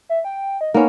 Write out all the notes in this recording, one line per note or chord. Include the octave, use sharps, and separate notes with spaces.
E5
G5
D#5
A#3 B3 C#4 D#4